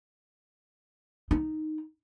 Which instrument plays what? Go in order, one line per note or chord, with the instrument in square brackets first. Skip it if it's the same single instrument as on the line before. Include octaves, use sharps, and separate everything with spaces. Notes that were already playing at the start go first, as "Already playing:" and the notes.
[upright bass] D#4